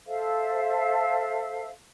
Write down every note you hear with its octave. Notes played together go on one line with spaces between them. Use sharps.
A4 C5 E5 F5